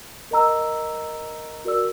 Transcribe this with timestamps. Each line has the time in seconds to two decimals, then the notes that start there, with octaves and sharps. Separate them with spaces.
0.31 A#4 D#5 A#5 E6
1.65 F#4 A#4 D5 E6